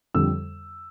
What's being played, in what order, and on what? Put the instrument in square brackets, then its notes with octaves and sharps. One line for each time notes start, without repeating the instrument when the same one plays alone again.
[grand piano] F2 D3 G3 E6